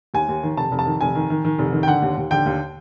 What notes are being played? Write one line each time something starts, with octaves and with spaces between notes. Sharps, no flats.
D#2 G#5
D#2
D#3
F1 A5
F1
A5
D#3
F1 G#5
D#3
D#3
D#3
F1
D#3
G5
D3 F#5
D#2
D#2
D3 G5
D#2